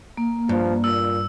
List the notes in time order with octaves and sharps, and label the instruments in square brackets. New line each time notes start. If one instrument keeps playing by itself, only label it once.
[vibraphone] A#3
[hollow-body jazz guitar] G2 [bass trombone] F3
[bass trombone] A#2 [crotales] E6